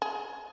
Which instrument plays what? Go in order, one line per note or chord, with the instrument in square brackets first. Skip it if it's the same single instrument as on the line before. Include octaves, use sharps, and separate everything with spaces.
[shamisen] G#4